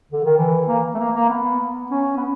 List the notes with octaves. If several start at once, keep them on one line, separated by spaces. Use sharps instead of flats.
D3
D#3
E3
A#3
A3
A#3
A#3
B3
C#4
B3